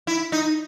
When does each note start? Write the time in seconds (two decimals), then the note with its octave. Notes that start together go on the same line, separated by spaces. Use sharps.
0.07 E4
0.32 D#4